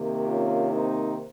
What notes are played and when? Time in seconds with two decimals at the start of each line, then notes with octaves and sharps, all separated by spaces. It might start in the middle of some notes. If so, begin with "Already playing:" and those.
Already playing: C3 D#3 A#3
0.27 C#4 F4
0.71 C4 D#4